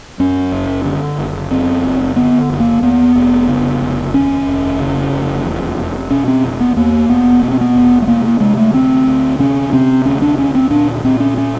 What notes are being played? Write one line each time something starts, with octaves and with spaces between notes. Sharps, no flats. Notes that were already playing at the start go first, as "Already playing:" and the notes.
F#2 C#4
F#1
D3
F#1
F#2 C4
F#1
D3 B3
F#1
A#3
D#2 B3
F1
C#3
F1
D#2 C#4
F1
C#3
F1
E2
F1
B2 C#4
C4
F1
B3
E2 A#3
F1 B3
B2 B3
C4
B3
F1
A3
C3 A#3
A#3
C3 G#3
A3
D2 C4
D2
C3 C#4
C3 C4
D2 C#4
D4
D2 C#4
C4
A#2 D4
A#2 C4
C#4
C#4